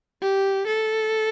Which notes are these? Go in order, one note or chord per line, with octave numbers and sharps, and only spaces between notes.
G4
A4